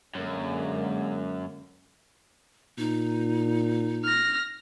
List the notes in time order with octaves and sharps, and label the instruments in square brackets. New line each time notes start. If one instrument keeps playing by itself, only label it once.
[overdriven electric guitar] F#2 [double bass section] D3 G#3 A#3
[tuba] A#2 [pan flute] D#4
[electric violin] F6 A#6